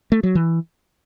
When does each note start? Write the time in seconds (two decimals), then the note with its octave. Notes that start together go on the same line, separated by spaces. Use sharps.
0.12 A3
0.23 F#3
0.35 E3